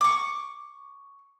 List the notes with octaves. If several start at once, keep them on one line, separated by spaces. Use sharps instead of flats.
C#6 D6